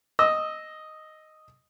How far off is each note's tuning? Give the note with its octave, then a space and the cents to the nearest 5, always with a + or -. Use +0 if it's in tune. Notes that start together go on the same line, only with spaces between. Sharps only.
D#5 +0 E6 -15